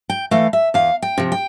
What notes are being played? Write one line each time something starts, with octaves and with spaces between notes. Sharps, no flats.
G5
E3 A3 F5
E5
E2 F5
G5
C3 F3
G5